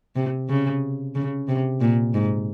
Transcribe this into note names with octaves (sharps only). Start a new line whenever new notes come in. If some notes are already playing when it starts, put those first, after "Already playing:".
C3
C#3
C#3
C3
A#2
G#2